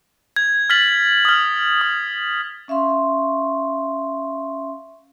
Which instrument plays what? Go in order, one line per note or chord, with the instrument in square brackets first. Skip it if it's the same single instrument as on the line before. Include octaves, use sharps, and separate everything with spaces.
[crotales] G#6
F6 A6 B6 F#7
D#6 F6
D#6
[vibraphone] C#4 E5 F5 C6 C#6